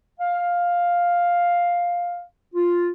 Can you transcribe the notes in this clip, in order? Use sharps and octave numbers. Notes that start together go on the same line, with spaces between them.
F5
F4